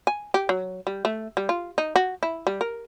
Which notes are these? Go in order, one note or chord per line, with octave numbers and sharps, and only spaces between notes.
G#5
G4
F#3
G3
A3
G3
F4
D#4
F#4
E4
G3
A#4